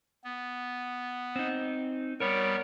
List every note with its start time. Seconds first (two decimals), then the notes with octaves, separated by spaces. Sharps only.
0.24 B3
1.36 C4 D#4
2.20 G3 B3 A#4 C#5